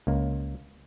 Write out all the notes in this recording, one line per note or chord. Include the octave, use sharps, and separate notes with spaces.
C#2 A#3